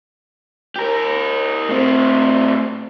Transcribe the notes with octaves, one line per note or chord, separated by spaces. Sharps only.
G4 A#4
A2 C4